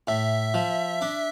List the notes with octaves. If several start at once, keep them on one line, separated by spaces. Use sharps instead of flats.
A2 E5
F3
D4